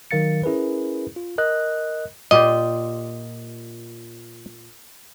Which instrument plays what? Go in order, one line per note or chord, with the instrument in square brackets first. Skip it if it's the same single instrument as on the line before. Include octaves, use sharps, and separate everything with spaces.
[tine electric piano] D#3 F#3 A#4 F5 A6 C#7
C#4 E4 G#4 A#4 B4
F4
A#4 D#5 F#6
[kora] A#2 F4 G4 [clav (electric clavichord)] D#5